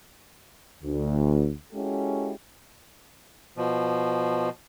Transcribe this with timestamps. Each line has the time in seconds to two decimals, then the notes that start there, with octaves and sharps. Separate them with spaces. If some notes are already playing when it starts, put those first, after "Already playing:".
0.84 D2
1.73 G#3 C#4 E4 F#4 G4 A4
3.57 B2 F3